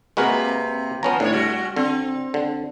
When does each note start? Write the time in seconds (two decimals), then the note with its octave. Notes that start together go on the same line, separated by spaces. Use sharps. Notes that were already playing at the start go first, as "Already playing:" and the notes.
0.17 C3 G#3 A#3 F#4 A#4 B4
1.03 F3 B3 C#4 A#5
1.20 A2 D4 C#5
1.33 G3 F#4
1.76 D3 C4
2.34 D3